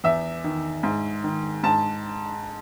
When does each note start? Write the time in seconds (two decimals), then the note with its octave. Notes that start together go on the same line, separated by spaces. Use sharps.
0.04 E2 E5
0.44 D#3
0.83 G#2
1.24 D#3
1.63 G#2 A5